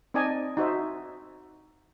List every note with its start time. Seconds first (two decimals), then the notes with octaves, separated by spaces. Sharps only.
0.14 C4 D#4 D5 D#5 G#5 A5
0.57 D#4 F#4 C5 E5